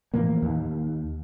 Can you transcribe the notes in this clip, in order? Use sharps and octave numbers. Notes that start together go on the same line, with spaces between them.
A2 E3 F3 A#3
D#2